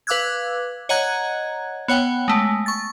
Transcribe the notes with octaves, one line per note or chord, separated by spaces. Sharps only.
B4 F5 D6 E6 F#6 G#6
C#5 D#5 F#5 A#5 F#6 G#6
B3 C#5 F#5 G5
G#3 A3
C#6 A6